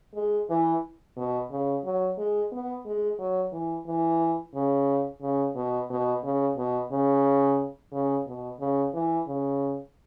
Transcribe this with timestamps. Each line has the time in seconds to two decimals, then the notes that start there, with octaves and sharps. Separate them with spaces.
0.15 G#3
0.50 E3
1.17 B2
1.51 C#3
1.84 F#3
2.17 G#3
2.52 B3
2.86 G#3
3.19 F#3
3.53 E3
3.86 E3
4.55 C#3
5.22 C#3
5.56 B2
5.90 B2
6.24 C#3
6.57 B2
6.92 C#3
7.93 C#3
8.26 B2
8.60 C#3
8.94 E3
9.27 C#3